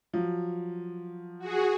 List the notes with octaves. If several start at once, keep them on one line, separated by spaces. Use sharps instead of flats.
F3 F#3
F#4 G#4